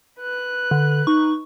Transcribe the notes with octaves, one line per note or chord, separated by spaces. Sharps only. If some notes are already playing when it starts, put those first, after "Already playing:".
B4 F#6
D3
D#4 C#6